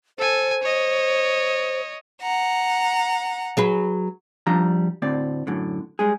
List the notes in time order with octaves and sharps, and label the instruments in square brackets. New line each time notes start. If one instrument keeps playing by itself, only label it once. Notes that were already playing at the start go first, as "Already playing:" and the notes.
[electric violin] A4 G#5 [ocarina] C5
[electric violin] C#5 D#5
[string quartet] F#5 A#5
[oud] F#3 G#4 B4
[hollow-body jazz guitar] F3 G3 D4 A#5
D2 A2 C4 D5
F#2 A2 D3
G3 G#3 G#4